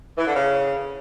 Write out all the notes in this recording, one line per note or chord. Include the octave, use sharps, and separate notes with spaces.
E3
D3
C#3